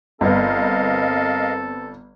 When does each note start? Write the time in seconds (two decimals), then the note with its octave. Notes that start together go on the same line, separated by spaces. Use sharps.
0.21 G1 B3 C4 A4 A#4 D#5 F5